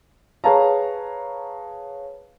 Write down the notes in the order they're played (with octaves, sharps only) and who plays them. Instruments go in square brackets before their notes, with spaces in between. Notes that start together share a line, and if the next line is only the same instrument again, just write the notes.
[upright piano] G#4 B4 C#5 F5 A5 A#5